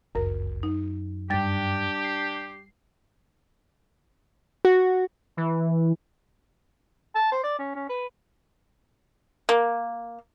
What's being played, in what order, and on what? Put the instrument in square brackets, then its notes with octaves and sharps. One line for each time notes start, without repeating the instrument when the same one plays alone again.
[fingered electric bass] G1 C#2 [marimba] F#2 A#4
[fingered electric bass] F#2 [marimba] D#4
[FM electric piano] G2 G5 [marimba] G3 A6 [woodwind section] D4 G4
[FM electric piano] C7
[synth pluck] F#4
[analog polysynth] E3
[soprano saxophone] A5
C5
D5
C#4
C#4
B4
[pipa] A#3